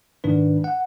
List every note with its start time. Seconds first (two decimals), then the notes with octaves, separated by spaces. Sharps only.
0.24 G#2 D#3 D4 B4
0.64 F#5